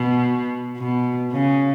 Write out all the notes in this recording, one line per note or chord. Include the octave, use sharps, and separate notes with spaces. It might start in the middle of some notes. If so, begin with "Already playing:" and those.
Already playing: B2
B2
C#3